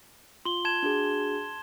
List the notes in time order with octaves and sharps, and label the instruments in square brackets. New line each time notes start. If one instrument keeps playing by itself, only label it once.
[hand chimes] F4 [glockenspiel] C6 G7
[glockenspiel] A5 G#6 E7
[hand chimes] D4 F#4 G#4